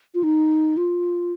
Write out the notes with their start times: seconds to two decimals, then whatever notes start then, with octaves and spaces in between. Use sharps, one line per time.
0.14 F4
0.23 D#4
0.77 F4